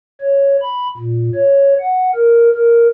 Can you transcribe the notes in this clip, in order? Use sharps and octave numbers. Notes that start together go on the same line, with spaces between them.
C#5
B5
A#2
C#5
F#5
A#4
A#4